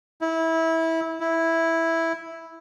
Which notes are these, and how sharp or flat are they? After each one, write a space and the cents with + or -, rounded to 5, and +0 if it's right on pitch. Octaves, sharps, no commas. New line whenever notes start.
E4 -20
E4 -5